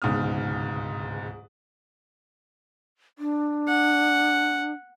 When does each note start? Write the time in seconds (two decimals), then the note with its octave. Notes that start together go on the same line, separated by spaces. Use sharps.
0.02 D1 C#2 G#2 B2 D#6 F6
3.19 D4
3.68 F#5